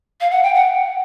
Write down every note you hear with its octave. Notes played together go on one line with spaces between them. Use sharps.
F5
F#5
G5
F#5